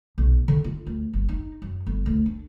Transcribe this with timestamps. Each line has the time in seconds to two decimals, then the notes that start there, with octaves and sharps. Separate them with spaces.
0.18 B1
0.48 D3
0.64 F4
0.86 D2
1.13 G1
1.29 D#4
1.62 F#2
1.87 G1
2.06 D2
2.26 D4